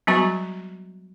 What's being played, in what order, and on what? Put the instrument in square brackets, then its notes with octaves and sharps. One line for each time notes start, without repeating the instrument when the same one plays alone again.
[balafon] F#3 G3 B3 F#4 A#5 C#6